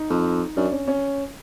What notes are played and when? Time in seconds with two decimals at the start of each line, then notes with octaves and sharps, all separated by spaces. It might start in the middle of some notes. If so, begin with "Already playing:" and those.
Already playing: D#4
0.10 F2
0.57 F#2 D4
0.72 C#4
0.88 C#4